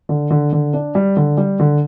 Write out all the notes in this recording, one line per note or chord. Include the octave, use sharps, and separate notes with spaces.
D3
D3
D3
D4
G3
D3
G3
D3